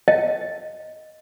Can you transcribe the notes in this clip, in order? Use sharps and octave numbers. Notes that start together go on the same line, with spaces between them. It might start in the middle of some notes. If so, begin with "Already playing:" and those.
D#5